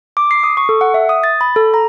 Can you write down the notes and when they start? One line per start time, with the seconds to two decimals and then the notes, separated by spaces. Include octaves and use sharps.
0.17 D6
0.31 C7
0.44 D#6
0.57 C#6
0.69 A4
0.81 F#5
0.94 E5
1.09 D#6
1.24 A6
1.41 B5
1.56 A4
1.74 A#5